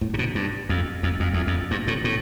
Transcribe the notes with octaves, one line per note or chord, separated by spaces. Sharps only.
A2
C3
B2
G2
F2
F2
F2
E2
F2
G2
A2
A2